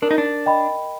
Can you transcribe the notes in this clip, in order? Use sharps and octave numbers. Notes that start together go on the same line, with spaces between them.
D4 A#4
D#4
D4
D#5 G5 B5